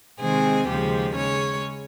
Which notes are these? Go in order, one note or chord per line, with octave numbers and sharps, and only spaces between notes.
C3 D#3 G#3 C4 G#4
D#2 C#3 F3 G#3 G4
C#3 G#3 C#4 C#5